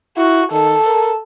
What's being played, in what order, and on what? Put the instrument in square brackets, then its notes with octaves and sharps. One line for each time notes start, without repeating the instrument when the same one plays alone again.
[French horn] E4 [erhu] F#4
[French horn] D#3 [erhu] A4
[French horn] A#4